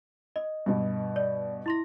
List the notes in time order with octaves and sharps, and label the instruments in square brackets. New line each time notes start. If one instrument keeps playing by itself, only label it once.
[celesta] D#5
[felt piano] G2 B2
[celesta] D5
E4 C6 A#6